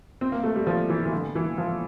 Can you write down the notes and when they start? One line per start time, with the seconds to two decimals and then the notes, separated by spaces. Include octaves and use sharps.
0.21 C4
0.32 A#3
0.44 A3
0.55 G3
0.67 F3
0.90 E3
1.06 E3
1.12 D3
1.35 E3
1.58 F3